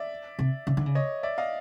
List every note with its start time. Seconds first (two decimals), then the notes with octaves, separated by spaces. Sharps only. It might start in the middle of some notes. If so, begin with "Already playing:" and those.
Already playing: D5 E5
0.39 C3
0.67 C#3
0.77 D3
0.86 C#3
0.95 C#5 D#5
1.23 D5 E5
1.38 D#5 F5